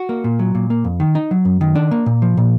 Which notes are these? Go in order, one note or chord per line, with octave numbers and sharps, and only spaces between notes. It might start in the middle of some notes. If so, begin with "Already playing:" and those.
Already playing: F#4
A#3
A#2
F#3
A#2
A#3
F2
D#3
D#4
F#3
F#2
D#3
D4
A#3
A#2
F3
A#2